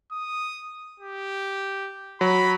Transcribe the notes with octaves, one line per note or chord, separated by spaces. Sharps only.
D#6
G4
F#3 B5